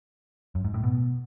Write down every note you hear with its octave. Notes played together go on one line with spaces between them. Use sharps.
F#2
G#2
A2
B2